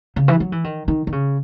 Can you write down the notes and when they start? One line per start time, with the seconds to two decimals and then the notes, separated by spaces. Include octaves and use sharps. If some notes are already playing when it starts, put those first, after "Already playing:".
0.16 C#3
0.28 E3
0.40 F#3
0.52 E3
0.64 D#3
0.88 D#3
1.07 D#3
1.12 C#3